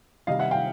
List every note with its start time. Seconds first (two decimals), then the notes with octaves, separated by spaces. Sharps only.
0.27 C3 D#3 G3 D#5 F5
0.39 E5 F#5
0.51 F5 G5